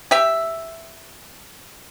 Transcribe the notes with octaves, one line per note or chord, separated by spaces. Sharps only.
G4 E5